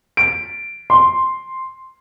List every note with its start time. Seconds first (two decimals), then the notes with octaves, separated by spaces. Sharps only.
0.17 D7
0.90 C6